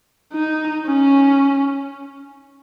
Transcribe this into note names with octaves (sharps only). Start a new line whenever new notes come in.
D#4
C#4